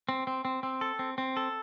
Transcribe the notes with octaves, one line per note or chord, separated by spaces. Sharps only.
C4
C4
C4
C4
A4
C4
C4
A4